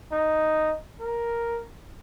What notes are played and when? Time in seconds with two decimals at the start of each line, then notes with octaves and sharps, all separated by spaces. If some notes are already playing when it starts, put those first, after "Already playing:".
0.12 D#4
1.00 A#4